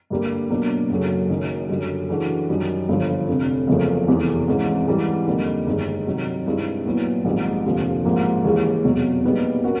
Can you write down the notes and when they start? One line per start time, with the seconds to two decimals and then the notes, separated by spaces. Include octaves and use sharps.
0.10 G2 D3 G3 A#3
0.50 B2 F#3 A#3 D4
0.90 F#1 F#2 C#3 F#3 A3
1.29 F#1 F#2 D#3
1.69 F#2 D3 G3
2.09 C#3 E3 A3 D4 F#4
2.49 F#2 D#3 G3
2.89 G1 G2 D3 F3
3.28 F1 F2 D3
3.67 F#1 E2 C#3 F3 A3
4.07 F1 E2 C3 E3 A3
4.48 G#1 G#2 E3 G#3 C#4
4.87 G#2 E3 G3
5.27 F2 D3 G3 A#3 D#4
5.66 G1 G2 D#3 G#3
6.06 C2 C3 D#3 F#3
6.46 G2 D#3 G#3 C4 E4
6.85 A#2 F#3 B3 E4
7.25 A#1 G#2 D#3 G3 C4
7.66 F1 D#2 D3 F3
8.05 A1 G#2 F3 A#3
8.44 D#2 C#3 E3 G#3
8.84 F1 E2 B2 F#3
9.24 A#2 G3 B3 D#4 G#4
9.64 C#4 F#4 A#4